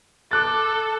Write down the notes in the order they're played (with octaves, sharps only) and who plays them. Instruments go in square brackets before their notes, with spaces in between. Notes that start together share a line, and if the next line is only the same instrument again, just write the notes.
[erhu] A4 [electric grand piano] D6 F#6 A6